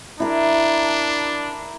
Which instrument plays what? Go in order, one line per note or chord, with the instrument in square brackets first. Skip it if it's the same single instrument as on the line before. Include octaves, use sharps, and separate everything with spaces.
[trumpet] D4 [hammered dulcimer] E4 A#4